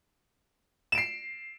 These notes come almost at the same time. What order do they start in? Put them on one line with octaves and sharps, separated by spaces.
E7 D7 C7